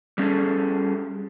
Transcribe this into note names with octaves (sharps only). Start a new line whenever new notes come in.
G3 C#4 G#4 A4